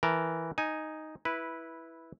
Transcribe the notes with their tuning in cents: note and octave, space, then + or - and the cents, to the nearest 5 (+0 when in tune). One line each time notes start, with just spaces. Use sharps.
E3 +0 A#4 +0 A5 +0
D#4 +0 G#5 +0
E4 -5 B4 -10